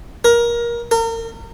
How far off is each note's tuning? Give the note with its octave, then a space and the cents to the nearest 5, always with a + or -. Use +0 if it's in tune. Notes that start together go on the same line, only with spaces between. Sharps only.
A#4 +20
A#4 -35